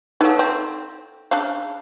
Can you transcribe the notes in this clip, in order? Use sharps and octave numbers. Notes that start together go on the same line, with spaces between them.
E3 F#3 D#4 A4 F5
C4
C#3 D4 F5